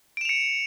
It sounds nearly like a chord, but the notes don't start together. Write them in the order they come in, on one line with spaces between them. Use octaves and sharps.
D7 E7 F7 C#7